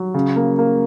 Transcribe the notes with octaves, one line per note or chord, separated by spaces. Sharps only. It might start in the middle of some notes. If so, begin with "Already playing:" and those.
Already playing: F#3
C#3
A#3
A#3